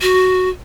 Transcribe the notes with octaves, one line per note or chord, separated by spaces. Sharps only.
F#4